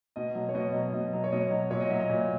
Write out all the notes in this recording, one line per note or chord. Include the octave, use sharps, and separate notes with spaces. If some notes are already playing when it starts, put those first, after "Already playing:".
B2 D#5
F#3
C#5
B2 D#5
F#3
B2 D#5
F#3
C#5
B2 D#5
F#3
A#2 C#5
D#5
F#3 E5
D#5
A#2